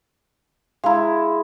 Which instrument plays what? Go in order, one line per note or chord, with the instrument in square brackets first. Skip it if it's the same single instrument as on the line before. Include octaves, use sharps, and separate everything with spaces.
[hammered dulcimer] G#3 E4 [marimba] F5 A#5